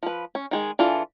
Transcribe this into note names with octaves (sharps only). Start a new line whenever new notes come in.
F3 B4
C#4
D#3 G#3 G#4
E3 D4 F4 G#4 A4